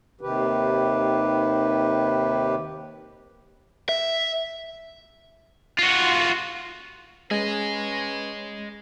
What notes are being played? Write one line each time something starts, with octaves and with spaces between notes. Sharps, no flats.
D#2 C3 D#3 G4 B4
E5
F4 F#4
G#3 C#4 G#4 B4 D#5